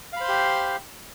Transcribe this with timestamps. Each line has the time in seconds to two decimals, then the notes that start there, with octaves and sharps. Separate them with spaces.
0.13 F5
0.17 B5
0.20 C5
0.24 C6
0.28 G4